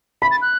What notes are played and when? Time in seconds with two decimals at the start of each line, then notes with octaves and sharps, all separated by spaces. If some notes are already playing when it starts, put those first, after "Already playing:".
0.22 B5 B6
0.31 A6
0.42 F#6